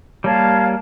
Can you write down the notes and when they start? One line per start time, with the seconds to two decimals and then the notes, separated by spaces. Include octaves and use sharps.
0.24 G3 A#3 C#5 F5 A5